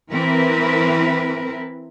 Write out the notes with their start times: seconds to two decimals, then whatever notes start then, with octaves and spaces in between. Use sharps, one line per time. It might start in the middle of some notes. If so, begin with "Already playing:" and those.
0.10 E3 C4 E4 A#4 B4